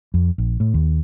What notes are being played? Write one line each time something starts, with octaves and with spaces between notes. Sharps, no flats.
F2
A#1
A2
D#2